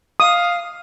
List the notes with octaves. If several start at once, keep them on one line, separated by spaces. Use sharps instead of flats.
F5 D#6